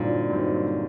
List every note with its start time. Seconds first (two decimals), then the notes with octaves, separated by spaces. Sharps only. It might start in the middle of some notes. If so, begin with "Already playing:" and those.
Already playing: G2 A#2 D3 F#3 C4 D#4
0.30 G2 F#3 C4 D#4